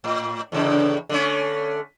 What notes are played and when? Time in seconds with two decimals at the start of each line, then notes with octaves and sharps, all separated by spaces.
0.04 A2
0.52 E2 A2 C#3
1.09 D3 A3 C#4